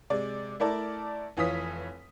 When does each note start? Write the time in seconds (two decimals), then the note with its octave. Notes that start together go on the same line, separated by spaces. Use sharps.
0.10 C3 G#3 D5
0.60 A3 E4 A#4 D5 A5
1.37 F1 E3 F4 C#5 D#6 B6